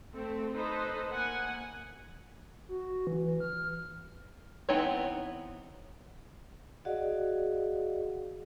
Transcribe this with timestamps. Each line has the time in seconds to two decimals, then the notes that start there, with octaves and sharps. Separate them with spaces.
0.13 A3 C4 A4
0.53 D#4 A4 B4 C5 D#5
1.10 A#3 F#5 G#5
2.69 F#4
3.07 E3
3.25 E3
3.40 F6
4.69 E3 B3 C4 D#4 C#5
6.85 F#4 G#4 D5 D#5 F5 F#5